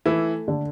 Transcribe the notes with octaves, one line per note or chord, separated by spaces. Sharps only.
E3 A3 E4
D3